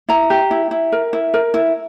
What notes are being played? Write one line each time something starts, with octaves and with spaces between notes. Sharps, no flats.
E4 A#5
G4
E4
E4
A#4
E4
A#4
E4